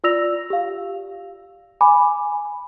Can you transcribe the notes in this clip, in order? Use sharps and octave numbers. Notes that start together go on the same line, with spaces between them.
F4 D5 E6 A#6 F7
G4 F5
G#5 B5 D6